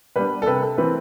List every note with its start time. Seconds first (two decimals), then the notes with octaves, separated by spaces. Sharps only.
0.16 G3 B3 D4 B4
0.42 A4
0.46 C3 B4
0.62 A4
0.77 E3 A3 C4 B4